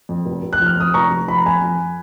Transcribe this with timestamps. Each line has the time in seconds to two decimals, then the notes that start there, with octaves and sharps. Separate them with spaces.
0.09 F2
0.26 F1
0.43 F1
0.53 F#6
0.60 F3
0.66 F6
0.77 F2 D#6
0.94 F1 A#5 C#6
1.11 F1
1.28 F3 B5
1.37 A#5
1.45 F2 G#5 B5
1.62 F2